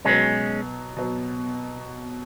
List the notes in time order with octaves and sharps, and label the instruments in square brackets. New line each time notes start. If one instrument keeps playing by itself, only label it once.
[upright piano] B2 F#3 B3 [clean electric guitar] G#3 C#4
[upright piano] B2 F#3 B3